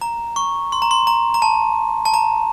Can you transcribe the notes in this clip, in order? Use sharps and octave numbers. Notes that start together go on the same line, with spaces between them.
A#5
C#6
C6
A#5
C6
A#5
A#5
A5
A5
A#5